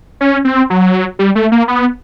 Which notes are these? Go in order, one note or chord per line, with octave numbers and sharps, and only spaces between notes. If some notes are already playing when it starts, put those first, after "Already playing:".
C#4
C4
F#3
G3
A3
A#3
B3